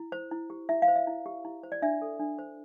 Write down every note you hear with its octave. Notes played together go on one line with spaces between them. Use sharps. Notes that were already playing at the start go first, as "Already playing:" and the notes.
Already playing: E4
C5
E4
G4
E4 E5
F5
C5
E5
E4
G4
E4
C5
D5
D4 E5
A4
D4
C5